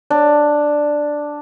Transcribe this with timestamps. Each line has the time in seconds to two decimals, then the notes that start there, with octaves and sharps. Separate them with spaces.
0.10 D4